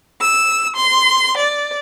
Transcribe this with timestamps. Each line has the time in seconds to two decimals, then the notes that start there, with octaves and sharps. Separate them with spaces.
0.21 E6
0.77 C6
1.37 D5